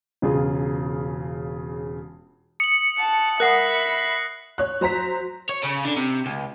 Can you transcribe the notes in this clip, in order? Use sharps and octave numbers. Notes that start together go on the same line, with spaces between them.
E1 C#3 F4 G#4
D#6 C#7 F#7
F#5 A5
A#4 E5 F#5 B5 D#6 F#6 A#6 C7
C#5 F#6
F#3 C5 A#5 B6
C#5
C#3
D3
C3
C#2